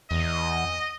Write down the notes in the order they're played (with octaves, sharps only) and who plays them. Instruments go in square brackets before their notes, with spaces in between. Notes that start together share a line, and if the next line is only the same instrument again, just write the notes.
[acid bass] E2 [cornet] D#5